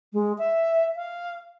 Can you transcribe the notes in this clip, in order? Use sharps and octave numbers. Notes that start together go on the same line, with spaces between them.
G#3
E5
F5